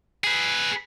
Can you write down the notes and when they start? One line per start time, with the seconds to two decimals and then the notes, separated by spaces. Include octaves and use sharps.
0.24 G#4 B4